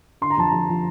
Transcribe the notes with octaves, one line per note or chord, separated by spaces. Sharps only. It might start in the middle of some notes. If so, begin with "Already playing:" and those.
D3 C6
A#5
F2 A5
A#5
F2
F3